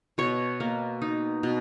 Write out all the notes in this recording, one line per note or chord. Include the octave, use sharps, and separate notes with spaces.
B2 C#5
A#3
D#4
B2